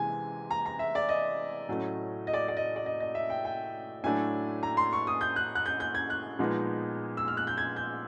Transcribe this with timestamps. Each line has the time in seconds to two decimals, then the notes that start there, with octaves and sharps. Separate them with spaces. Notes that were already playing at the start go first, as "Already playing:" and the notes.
Already playing: C3 E3 G#3 G#5
0.51 A#5
0.66 A#5
0.79 E5
0.95 D5
1.09 D#5
1.69 A2 F#3 A3 C#4
2.27 D#5
2.33 D5
2.48 D5
2.57 D#5
2.76 D5
2.86 D#5
3.00 D#5
3.15 E5
3.30 G5
3.45 G5
4.04 A2 F#3 A3 D4 G#5
4.63 A#5
4.77 C6
4.93 C#6
5.07 D#6
5.21 G6
5.36 F#6
5.55 F#6
5.66 G6
5.80 G6
5.95 G#6
6.10 F#6
6.39 A#2 F3 G#3 B3 D#4
7.17 E6
7.28 F6
7.37 F#6
7.47 G6
7.57 G#6
7.76 G6